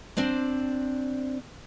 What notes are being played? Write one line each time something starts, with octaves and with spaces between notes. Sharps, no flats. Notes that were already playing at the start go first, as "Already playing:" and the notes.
C4 D4 C5 D5